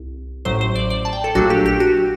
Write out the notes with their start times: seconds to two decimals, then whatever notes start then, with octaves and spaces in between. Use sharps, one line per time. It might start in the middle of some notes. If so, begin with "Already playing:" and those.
Already playing: C2
0.45 A1 A2 F#3 C5
0.61 C5
0.76 D5
0.90 D5
1.05 A5
1.13 G5
1.24 A4
1.35 A#1 A#2 F#3 A3 D4 F#4
1.50 G4
1.66 G4
1.80 F#4